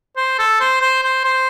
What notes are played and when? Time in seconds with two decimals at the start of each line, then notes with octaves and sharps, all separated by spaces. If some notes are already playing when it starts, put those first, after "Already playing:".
0.17 C5
0.39 A4
0.60 C5
0.82 C5
1.03 C5
1.24 C5